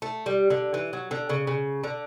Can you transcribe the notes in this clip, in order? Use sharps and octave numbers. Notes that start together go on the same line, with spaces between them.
A3
G3
D3
E3
F#3
D3
C#3
C#3
D3